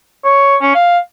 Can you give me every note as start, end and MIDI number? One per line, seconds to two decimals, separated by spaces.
0.24 0.56 73
0.61 0.74 61
0.75 0.98 77